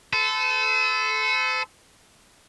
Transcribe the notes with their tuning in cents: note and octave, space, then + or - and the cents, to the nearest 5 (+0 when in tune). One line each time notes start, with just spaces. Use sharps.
A4 -10 C5 -45